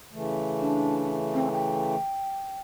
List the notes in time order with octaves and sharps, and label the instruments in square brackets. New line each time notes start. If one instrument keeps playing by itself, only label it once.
[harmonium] C#3 E3 A3
[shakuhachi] D4
C4
G5